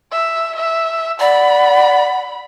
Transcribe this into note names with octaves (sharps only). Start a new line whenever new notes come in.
E5
E5
D5 F#5 B5